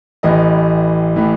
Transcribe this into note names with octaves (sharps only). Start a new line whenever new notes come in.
A1 A2 E3 D#5
A2 E3